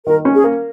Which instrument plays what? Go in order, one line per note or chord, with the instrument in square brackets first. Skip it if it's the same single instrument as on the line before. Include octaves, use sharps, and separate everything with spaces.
[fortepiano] D#3 [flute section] A#4
[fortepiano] C#4
[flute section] G#4
[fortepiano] A#3